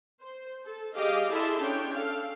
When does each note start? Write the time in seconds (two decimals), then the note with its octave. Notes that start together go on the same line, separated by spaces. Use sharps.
0.21 C5
0.65 A4
0.96 G3 G4 G#4 D#5 F5
1.30 E4 G#4 A4 E5 A5 C6
1.61 C#4 D4 C#5 G5
1.94 A4 F5